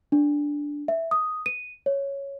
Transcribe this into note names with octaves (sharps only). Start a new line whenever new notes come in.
D4
E5
D#6
D#7
C#5